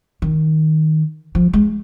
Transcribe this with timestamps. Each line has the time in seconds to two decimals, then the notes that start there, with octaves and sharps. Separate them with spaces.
0.22 D#3
1.35 F3
1.53 G#3